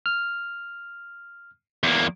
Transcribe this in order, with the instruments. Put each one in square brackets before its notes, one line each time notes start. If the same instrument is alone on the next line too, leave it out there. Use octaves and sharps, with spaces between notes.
[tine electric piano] F6
[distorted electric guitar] E2 A#3